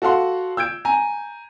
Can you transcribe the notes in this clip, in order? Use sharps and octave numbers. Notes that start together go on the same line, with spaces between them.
F#4 A4 F5 F#5 C6
E6 G6 G#6 D7
G#5 A#5